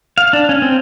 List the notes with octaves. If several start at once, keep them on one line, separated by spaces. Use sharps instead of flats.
F5
D4
C#4
C4